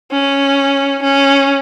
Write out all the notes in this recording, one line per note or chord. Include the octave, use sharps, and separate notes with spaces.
C#4
C#4